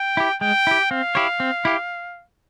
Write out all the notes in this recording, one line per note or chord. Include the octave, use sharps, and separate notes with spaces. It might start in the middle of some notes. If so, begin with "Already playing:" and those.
Already playing: G5
E4 G4
G#3 G5
E4 G4
C4 F5
E4 G4 C#5
C4
E4 G4